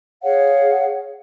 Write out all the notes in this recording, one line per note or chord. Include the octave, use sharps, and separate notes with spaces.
G#4 C#5 F5 F#5